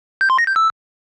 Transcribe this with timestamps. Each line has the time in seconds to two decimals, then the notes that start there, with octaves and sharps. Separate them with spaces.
0.21 G6
0.30 C6
0.38 A#6
0.47 G6
0.56 E6